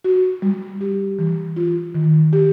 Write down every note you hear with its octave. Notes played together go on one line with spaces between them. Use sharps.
F#4
G3
G4
E3
F4
D#3
G4